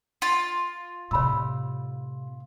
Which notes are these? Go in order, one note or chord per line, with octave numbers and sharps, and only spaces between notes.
F4
A2 C3 C#5 B5 E6